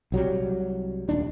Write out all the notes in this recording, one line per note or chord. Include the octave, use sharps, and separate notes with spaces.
C2 F#3 G3
D#1 D#2 D4